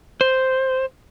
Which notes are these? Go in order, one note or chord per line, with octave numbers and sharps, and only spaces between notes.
C5